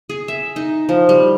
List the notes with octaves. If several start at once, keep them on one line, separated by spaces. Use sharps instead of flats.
G#4
E5
D#4
F3
G3